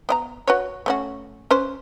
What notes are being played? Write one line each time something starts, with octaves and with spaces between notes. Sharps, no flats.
B3 D#5 A#5
F#4 B4 C#5
A3 C#4 F#4
C#4 B4 C5